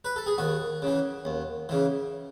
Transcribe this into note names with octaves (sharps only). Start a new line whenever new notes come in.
B4
A4
G#4
D#2 F#4
C#3 E3
D#2
C#3 E3